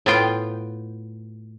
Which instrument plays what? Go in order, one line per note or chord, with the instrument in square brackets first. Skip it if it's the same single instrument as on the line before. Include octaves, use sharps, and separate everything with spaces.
[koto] A2 B3 F4 G5